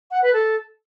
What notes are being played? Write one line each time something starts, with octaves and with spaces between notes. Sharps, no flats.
F#5
B4
A4